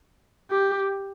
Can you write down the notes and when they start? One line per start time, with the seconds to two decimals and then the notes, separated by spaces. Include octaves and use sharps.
0.50 G4